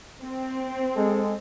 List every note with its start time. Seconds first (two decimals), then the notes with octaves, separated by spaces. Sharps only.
0.23 C4
0.96 G#3 A4